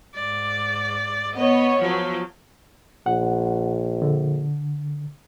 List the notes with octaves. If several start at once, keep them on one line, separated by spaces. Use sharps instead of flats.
G#2 D5
B3 C#5 D#5
F3 F#3
A#1 F#5
D3